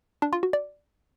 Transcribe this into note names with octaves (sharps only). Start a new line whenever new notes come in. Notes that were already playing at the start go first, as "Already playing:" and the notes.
D4
F4
F#4
D5